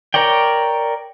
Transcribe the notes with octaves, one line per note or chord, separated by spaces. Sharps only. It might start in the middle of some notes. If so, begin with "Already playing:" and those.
A#4 C#5 D5 G5